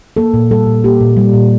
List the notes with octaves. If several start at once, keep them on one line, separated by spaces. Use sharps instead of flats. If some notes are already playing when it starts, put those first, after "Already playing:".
A#3 A4
A#2
G3 A4
A#2
A#3 G4
A#2
G3
A#2